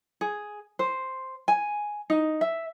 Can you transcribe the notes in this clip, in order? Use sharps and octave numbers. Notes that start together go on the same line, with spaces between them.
G#4
C5
G#5
D#4
E5